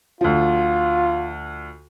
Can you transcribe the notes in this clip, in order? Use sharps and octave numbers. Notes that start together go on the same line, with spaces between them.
D2 F3 F4